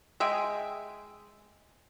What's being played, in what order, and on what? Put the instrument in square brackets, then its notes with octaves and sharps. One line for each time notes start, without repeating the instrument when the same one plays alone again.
[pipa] G#3 E5 G5 G#5